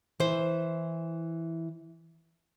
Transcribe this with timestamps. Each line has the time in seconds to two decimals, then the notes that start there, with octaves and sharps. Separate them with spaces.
0.20 E3 C5